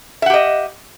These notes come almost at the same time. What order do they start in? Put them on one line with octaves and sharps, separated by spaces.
E5 F#5 G4 D#5